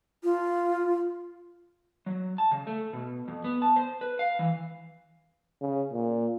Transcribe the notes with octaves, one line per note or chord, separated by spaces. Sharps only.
F4
F#3
A5
C#3
A3
B2
F2
B3
A5
C5
B4
F5
E3
C#3
A#2